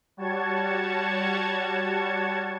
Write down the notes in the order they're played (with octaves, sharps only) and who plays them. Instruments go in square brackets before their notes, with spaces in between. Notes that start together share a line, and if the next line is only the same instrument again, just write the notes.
[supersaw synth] G3 F#4 C#5 A5 C#6 G#6